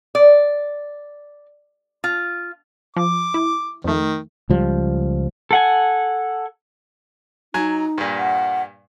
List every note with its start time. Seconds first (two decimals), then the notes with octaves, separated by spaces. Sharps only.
0.15 D5
2.04 F4
2.97 F3 D6
3.34 E4
3.84 F2 D#3 A3
4.50 C#2 F3 G3
5.51 A4 F#5 G#5
7.54 F#3 D#4 G#5
7.98 G2 A#2
8.18 F#5